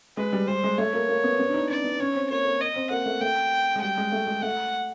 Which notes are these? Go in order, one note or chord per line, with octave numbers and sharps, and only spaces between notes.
G#3 B4
G3
G3 C5
G#3
A3 C#5
A#3
A#3
B3
B3
D4
D#4
C#4 D5
B3
C#4 C#5
C4
A#3 C#5
A#3
D#5
C4
A#3 F#5
A3
A3 G5
G#3
G3 G5
G#3
A3
G#3
A3 F#5